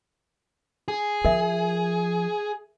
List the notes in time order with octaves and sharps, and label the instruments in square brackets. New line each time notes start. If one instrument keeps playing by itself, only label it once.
[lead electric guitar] G#4
[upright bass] F3 [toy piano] A#4 E5